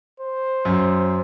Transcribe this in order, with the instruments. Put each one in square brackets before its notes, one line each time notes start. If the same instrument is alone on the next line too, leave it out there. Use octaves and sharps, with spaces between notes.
[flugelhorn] C5
[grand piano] F#2